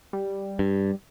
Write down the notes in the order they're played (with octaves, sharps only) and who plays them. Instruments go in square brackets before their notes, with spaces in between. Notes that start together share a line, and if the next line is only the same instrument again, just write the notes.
[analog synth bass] G3
[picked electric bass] G2